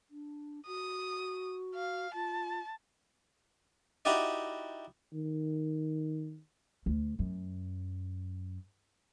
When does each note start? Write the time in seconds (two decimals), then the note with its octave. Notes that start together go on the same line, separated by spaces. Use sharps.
0.10 D4
0.67 F#4 D#6
1.75 F5
2.14 F4 A5
4.05 D#4 E4 F#4 G4 D5 D#5
5.13 D#3
6.86 D2
7.19 F#2